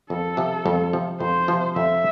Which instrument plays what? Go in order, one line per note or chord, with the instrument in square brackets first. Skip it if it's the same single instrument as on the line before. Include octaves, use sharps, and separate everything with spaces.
[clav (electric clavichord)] F2 [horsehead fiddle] A4
[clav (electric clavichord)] C3 F3
F2
C3 F3
[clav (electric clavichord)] F2 [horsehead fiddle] C5
[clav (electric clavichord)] C3 F3
[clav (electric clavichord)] F2 [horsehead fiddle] E5